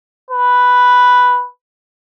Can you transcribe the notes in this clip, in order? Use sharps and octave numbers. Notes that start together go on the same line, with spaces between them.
B4